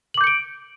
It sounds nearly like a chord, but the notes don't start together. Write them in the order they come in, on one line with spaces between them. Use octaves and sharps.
F#7 D6 G6 C#7 D7